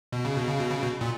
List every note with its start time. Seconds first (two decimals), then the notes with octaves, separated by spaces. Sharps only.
0.12 B2
0.25 C#3
0.36 B2
0.48 C#3
0.60 B2
0.71 C#3
0.83 B2
1.01 A#2